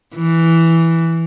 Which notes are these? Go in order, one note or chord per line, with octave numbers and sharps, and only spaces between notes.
E3